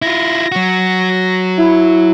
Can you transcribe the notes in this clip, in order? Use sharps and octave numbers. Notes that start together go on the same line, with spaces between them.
E4 F4 A#6
F#3 F#4
E4